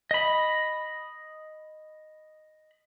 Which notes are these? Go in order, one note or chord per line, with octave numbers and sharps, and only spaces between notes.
D#5 B5